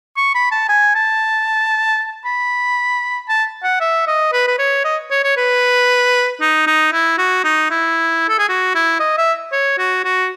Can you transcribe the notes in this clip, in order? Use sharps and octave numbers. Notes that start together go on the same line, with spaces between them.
C#6
B5
A5
G#5
A5
B5
A5
F#5
E5
D#5
B4
B4
C#5
D#5
C#5
C#5
B4
D#4
D#4
E4
F#4
D#4
E4
A4
G#4
F#4
E4
D#5
E5
C#5
F#4
F#4